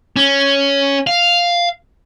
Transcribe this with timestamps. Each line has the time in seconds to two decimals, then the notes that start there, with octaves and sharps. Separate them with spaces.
0.16 C#4
1.07 F5